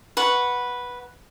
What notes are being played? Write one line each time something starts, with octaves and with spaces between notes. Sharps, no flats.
B4 F#5 C#6